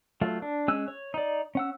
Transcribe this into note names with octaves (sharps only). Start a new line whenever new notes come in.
F#3 A3 F4
D4
G#3 C#4 G#5 E6 F#6
C#5
D#4 D5
C#4 F#5 E6